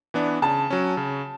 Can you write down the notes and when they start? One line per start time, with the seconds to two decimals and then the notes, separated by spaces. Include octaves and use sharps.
0.14 E3 B3 D4
0.42 C#3 A5
0.70 F#3 C#4
0.97 C#3